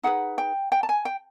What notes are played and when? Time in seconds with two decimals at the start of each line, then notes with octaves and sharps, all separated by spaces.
0.03 D#4 G#4 B4 F#5
0.38 G5
0.72 G5
0.83 A5
0.89 G#5
1.05 G5